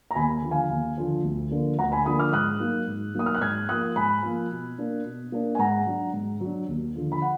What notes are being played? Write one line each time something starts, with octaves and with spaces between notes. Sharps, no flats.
A#5
D#2 G#5 B5
D3 F3
F5 G#5
D#2
D3 F3
D2
D3 F3 A#3 D4
D2 F#5 A#5
G#5 B5
D3 F3 A#3 D4 B5 D#6
D6 F6
G#2 D#6 F#6
F#3 A#3 D#4
G#2
F#3 A#3 D#4 D#6
F6
F#6
G#2 F6 G#6
F3 A#3 D#6 F#6
G#2 G#5 B5
F3 A#3
B2
A#3 D4
B2
A#3 D4
G#5
G#2 F#5 A#5
F#3 D4
G#2
F#3 D4
D#2
D3 F3
B5
F#5